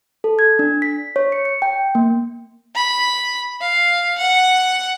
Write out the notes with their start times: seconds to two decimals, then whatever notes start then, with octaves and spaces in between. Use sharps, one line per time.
0.24 A4
0.39 G#6
0.59 D4
0.82 B6
1.16 C#5
1.32 C#7
1.45 C#7
1.62 G5
1.95 A#3
2.75 B5
3.61 F5
4.18 F#5